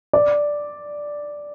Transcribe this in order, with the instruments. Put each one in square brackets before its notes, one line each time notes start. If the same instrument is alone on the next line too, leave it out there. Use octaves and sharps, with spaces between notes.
[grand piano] D5